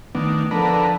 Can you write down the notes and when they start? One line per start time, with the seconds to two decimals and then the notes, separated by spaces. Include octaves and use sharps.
0.15 D#3 A3 B3 D4
0.51 D3 F3 D4 A#4 B4 A5